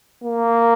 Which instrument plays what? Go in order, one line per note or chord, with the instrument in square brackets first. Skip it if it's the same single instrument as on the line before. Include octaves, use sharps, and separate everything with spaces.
[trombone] A#3